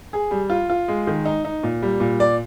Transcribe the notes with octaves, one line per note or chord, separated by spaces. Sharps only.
G#4
G3
F4
F4
G#3
D#3
D#4
D#4
A#2
G3
A#2
D5